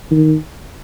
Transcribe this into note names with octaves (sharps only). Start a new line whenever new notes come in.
D#3